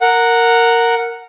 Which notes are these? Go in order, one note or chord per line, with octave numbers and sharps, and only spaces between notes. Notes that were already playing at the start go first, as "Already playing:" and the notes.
A#4 F#5